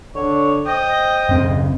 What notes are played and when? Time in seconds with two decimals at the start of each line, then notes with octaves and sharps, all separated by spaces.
0.15 D3 C#5
0.66 C5 D#5 G5
1.29 F#1 C#3 C4